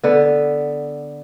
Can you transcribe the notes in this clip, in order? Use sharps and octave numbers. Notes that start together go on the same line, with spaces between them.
D3 B3